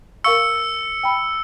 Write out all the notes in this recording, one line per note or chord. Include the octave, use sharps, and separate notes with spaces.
A#4 F5 C#6 E6 C#7
G5 B5